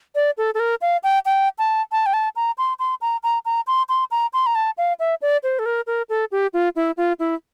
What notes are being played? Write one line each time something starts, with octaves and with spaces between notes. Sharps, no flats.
D5
A4
A4
A#4
F5
G5
G5
A5
A5
G5
A5
A#5
C6
C6
A#5
A#5
A#5
C6
C6
A#5
C6
A#5
A5
F5
E5
D5
C5
A4
A#4
A#4
A4
G4
F4
E4
F4
E4